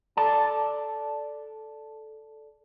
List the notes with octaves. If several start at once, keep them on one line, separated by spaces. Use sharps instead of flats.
A4 D5 A5